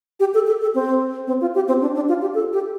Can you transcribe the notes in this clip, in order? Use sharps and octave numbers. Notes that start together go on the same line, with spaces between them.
G4
A4
A4
A4
C4
C4
F4
G4
C4
D4
D4
F4
G4
A4
G4